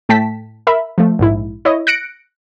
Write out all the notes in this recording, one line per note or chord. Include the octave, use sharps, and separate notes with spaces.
A2 A3 G5 A5 B6
A#4 E5 B5
F3 A3
A#1 G#2 E4
E4 C#5 D#5
F#6 A#6 C#7 D7